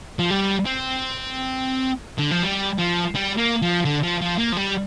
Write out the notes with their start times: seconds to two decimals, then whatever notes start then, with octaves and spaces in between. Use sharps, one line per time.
0.19 F3
0.31 G3
0.65 C4
2.19 D3
2.31 F3
2.43 G3
2.79 F3
3.15 G3
3.38 A#3
3.62 F3
3.85 D3
4.03 F3
4.21 F3
4.38 A#3
4.52 F3
4.57 G3